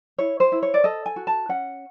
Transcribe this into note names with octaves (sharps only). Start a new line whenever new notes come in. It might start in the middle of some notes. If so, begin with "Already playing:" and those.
E4 C#5
C5
E4
C#5
D5
A4 D#5
G#5
F#4
A5
C#4 F#5